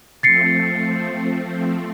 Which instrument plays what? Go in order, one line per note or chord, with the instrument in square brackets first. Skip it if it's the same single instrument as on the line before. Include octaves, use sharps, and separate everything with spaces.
[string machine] F3 A3 C4 [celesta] A6 C7 C#7